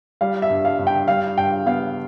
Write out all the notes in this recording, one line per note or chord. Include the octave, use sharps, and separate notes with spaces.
G3 F5
E5
G2
F5
G2
G5
G3 F5
G2 G5
B3 F5